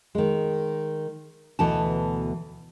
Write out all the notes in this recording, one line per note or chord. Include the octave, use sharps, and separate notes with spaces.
D#3 G#3
D2 B2 E3 B3 A5